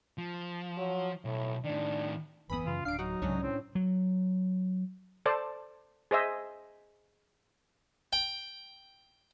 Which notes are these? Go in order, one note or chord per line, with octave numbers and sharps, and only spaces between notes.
F3
F#3
B1 A2
A2 D#3 D4
G1 E2 E3 B3 B5 D#6
F#2 C#3 F4
D1 D4 F5 C7 D7
F#3 D#4 F#4
C2 G#2 C#3 F#3 C#4 D4 C#5
A2 C4
F#3
A4 C5 D5 A5
G#4 C5 D#5 E5
G5